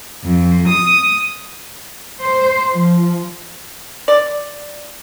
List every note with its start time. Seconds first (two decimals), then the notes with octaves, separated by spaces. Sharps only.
0.24 F2
0.68 D#6
2.19 C5
2.71 F3
4.08 D5